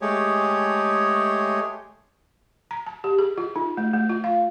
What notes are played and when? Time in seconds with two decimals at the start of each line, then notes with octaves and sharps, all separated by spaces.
0.01 G#3 A3 G4 G#4 C#5
2.71 A#5
2.87 A5
3.04 G4
3.19 G#4
3.38 F4
3.56 D#4
3.77 A3
3.94 A3
4.09 F4
4.24 F5